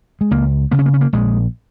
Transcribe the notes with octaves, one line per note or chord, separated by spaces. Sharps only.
G#3
C#2 A#3
C#3 A#3
C#4
A#3
C#4
A#3
A#1 G#3